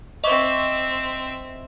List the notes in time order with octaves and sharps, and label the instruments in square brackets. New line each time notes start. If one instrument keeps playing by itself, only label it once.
[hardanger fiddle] C4 E5 [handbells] D#5 C#6 D6